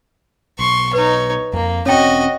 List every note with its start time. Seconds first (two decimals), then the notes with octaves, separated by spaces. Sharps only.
0.59 B1 C6 C#6
0.93 D#4 B4 C#5
1.53 F2 A#3
1.86 E1 C4 C#4 F#4 C#5 D#5 G5